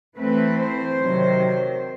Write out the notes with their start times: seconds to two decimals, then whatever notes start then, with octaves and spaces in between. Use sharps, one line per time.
0.18 E3 A3 C4 B4
0.59 C5
0.99 C3 D#3 F#3